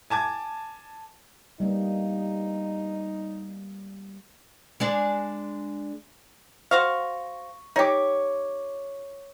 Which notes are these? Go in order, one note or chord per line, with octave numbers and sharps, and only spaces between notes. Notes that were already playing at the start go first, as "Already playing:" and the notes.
G#5 A5 D6 G#6
G3 A#3 B3 D#4
G#3 D4 D5
F#4 C5 F5 C#6 A#6
D#4 G4 C#5 D6